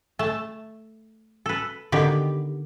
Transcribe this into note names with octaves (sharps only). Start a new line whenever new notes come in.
A3 A5
A4 B4
D3 D#3 B3 G4